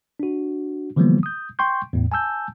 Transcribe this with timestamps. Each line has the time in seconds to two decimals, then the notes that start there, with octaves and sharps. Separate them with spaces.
0.20 D4 F#4
0.96 D3 E3 F3 G3 A#3 B3
1.23 D#6 G6
1.59 G5 C6 C#6 G6
1.93 E2 A2
2.12 G#5 A5 E6 G6